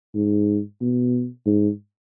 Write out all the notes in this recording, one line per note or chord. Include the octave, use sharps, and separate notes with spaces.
G#2
B2
G#2